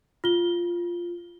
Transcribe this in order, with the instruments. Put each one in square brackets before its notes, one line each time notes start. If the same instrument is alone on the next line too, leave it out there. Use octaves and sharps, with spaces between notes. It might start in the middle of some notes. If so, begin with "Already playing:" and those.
[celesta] F4 G7